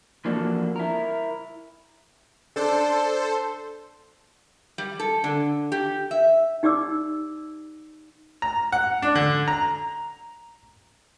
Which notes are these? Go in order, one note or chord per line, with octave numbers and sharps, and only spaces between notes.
E3 F3 A#3 D4 F#4 A4
E4 A#4
D4 A4 C5
G3
A4
D3
G4
E5
D#4 G4 D5 D6 E6
A#5
F#5
D4
D3
A#5